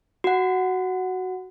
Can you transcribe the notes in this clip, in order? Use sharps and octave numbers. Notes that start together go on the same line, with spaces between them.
F#4 F#5